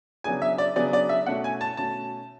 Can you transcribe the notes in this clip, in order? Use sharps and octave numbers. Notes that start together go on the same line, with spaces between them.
C#3 F#3 B3 D4 G#4 G#5
E5
D5
C#3 F#3 B3 D4 G#4 D5
D5
E5
B2 A3 C#4 F#4 F#5
G#5
A5
B2 A3 C#4 F#4 A5